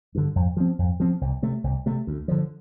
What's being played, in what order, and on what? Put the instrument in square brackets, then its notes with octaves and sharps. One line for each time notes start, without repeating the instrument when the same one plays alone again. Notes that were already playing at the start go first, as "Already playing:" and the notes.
[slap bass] G2 D3
F2
F3 C4
F2
F3 C4
C2
C3 A3
C2
C3 A3
D2
D3 F3